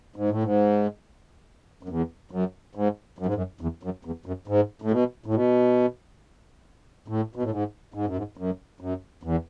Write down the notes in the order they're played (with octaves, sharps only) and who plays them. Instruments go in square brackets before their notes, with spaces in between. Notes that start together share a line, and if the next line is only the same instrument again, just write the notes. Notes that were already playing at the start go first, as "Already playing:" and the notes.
[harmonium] G#2
A2
G#2
F#2
E2
F#2
G#2
F#2
G#2
F#2
E2
F#2
E2
F#2
G#2
A2
B2
A2
B2
A2
B2
A2
G#2
G#2
F#2
G#2
F#2
F#2
E2